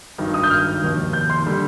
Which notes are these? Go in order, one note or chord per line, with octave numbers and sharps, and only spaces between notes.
G#1 G2 D#3
D#6
G6
F6
F1 D#2 D#3
G6
C6
D3 G3